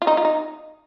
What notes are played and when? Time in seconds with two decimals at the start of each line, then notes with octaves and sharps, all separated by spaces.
0.02 F4
0.07 D#4
0.17 F4
0.25 D#4